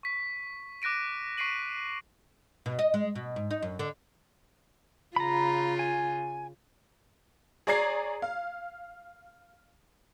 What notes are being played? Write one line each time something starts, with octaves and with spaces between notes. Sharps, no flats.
C#6 B6
D6 F#6 A#6 D7 D#7
C#6 B6 C7 D7 D#7 F#7
B2
D#5
G#3
B2
G#2
D#4
F#2
D3
C#3 F4 A#5 B5
G#5
G#4 C#5 D5 A#5 G#6 C7
F5